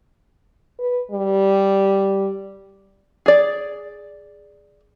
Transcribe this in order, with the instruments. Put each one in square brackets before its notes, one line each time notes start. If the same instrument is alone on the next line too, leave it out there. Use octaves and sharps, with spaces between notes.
[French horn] B4
G3
[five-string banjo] G#4 D5